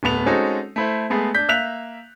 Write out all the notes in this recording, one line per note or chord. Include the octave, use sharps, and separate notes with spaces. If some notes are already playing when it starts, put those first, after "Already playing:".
D1 A3 B3 F7
G#3 C4 C#4 D#4 F#4 A4
A3 E4 C5
G#3 A3 B3 G#4
D4 G6 B6
A#3 E5 F#6 B6 F7